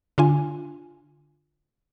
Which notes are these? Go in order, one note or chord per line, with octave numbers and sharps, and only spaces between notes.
D3 D4 F4 G#5